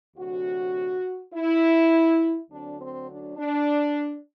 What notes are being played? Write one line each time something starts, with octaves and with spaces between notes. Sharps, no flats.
D2 C3 F#3 F#4
E4
D2 D3 F#3 C4 D4
C4
D4
D4